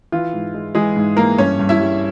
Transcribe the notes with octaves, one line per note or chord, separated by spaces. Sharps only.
E3 F4
G#2
G#3
E3 G#3 G#4
G#2
E3 A#3 A#4
G2 C#4 C#5
G2
E4 E5
G3